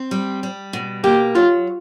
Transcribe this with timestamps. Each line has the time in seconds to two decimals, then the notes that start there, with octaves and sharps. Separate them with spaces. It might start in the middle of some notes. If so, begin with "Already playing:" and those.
Already playing: C4
0.11 G3
0.43 G3
0.73 B2
1.04 A#3 G4
1.35 F#3 F4